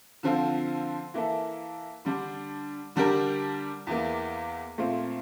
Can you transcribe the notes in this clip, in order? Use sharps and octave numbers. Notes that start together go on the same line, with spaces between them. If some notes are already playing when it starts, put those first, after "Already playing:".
D3 F3 C4 F4 A4
E3 A#3 E4 A4
D3 G3 D4
D3 G3 D4 G4 A#4
E2 E3 A#3
A#2 A3 C4 F4